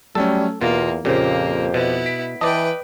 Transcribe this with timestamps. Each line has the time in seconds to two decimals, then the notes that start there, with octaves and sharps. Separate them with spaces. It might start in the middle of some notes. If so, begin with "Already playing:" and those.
0.15 F#3 G3 A3 C#4 A4
0.61 E2 B2 A#3 F4
1.05 F2 A#2 C#3 A#3 G4 C5
1.74 B2 B3 E4
2.06 B6 D7
2.41 E3 B4 D5 D#5 G5 A5